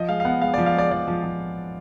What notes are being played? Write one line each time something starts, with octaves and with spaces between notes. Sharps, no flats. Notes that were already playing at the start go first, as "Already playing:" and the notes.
Already playing: F3 D#5
G#3 F5
F5
B3 F#5
G#3 F5
F3 D5
F5
G#3 D5
F3 D5
F3
F3